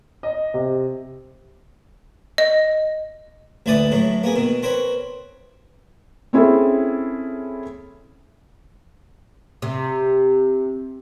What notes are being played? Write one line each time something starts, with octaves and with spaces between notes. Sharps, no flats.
D#5
C3
D#5
A1 D2 E4 B4 D5 D#6
A2 F#3 A3
A#3 B3 G#4
B2 D#3
C4 A#4 B4 C#5
C4 C#4 E4 G#4 A4
C3